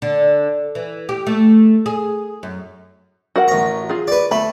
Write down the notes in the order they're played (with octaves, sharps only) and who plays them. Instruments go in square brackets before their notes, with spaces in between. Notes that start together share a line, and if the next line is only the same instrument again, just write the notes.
[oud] D3
E3
G4
A3
G#4
F#2
[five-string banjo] F#4 A#4 F#5
[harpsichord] A1 A#5
[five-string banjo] F4 G#4
[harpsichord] B4 D5
[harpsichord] A3 [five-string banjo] B5